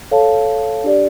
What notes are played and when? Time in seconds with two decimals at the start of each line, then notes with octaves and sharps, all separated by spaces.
0.11 A4 C#5 F5 A5
0.84 D4 G4 D5